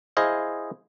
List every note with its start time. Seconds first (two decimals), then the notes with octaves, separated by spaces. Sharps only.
0.17 E4 G#4 C5 D#5 F5